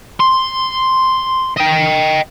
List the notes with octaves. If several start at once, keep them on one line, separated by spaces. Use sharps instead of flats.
C6
D#5 G5